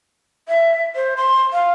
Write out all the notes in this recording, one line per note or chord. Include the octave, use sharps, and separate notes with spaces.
E5
C5
C6
F5